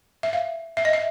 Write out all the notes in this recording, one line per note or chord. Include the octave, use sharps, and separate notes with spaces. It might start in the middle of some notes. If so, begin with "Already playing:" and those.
E5
F5
E5
D#5
E5